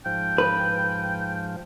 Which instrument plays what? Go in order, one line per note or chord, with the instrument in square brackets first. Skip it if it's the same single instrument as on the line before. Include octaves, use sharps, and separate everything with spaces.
[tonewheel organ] G#2 F3 [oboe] G5
[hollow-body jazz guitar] B4